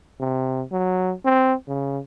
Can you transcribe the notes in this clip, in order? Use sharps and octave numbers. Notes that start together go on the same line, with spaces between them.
C3
F#3
C4
C#3